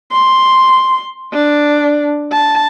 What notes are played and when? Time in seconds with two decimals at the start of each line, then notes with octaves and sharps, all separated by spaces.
0.12 C6
1.33 D4
2.32 A5